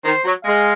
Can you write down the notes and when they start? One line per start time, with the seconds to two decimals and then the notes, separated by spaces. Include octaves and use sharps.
0.05 D#3 C5
0.25 F#3
0.45 G#3 F5